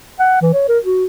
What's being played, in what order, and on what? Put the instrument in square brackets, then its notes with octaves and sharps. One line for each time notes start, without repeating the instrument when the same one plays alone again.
[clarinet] F#5
E3
C#5
A#4
F#4